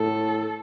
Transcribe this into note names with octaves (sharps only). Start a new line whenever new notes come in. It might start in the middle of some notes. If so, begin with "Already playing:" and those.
Already playing: A2 A4